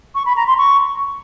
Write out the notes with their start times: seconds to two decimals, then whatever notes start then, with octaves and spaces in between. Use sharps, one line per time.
0.15 C#6
0.26 B5
0.36 A#5
0.47 C6
0.58 C#6